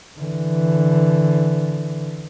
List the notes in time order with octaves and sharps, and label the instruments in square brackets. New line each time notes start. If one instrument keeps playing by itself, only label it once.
[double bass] D3 E3